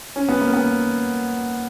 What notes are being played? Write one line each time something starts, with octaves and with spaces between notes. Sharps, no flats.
C#4
B3
A#3
B3